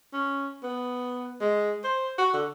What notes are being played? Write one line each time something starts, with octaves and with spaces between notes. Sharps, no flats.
C#4
B3
G#3
C5
F#4
D3